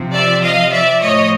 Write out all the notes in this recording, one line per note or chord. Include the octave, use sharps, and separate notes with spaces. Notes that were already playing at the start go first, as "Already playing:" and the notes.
Already playing: C3 F3
D5 E5
D#5 F5
D5 E5
A2 F3 C#5 D#5